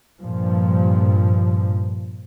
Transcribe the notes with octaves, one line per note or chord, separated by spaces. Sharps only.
G2 A#2 F3